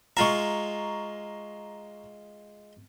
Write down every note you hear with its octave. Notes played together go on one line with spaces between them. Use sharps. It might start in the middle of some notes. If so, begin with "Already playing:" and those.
G#3 F4 E5 A#5 C#6